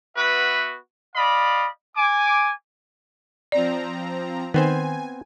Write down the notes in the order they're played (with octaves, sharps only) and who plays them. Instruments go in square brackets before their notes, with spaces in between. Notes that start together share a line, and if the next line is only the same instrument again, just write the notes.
[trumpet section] B3 F#4 B4 E5
D5 D#5 F5 B5
G#5 D6
[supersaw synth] F3 C4 A#5 [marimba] D5
[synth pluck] D#3 [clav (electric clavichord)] B3 C4 C5 [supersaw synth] G#5